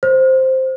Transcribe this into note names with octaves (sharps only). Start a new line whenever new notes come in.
C5